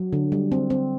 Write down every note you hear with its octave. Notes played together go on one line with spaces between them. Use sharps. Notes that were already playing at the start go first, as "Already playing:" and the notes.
Already playing: F#3
D3
G3
C4
C4